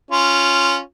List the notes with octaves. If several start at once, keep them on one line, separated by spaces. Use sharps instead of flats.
C#4 F4